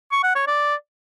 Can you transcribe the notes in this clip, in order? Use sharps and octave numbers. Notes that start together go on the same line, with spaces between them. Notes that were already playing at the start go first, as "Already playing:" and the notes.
C#6
F#5
C#5
D5